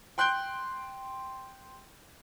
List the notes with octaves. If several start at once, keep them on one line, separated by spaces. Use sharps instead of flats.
G5 C6 F#6 G6 D7 G7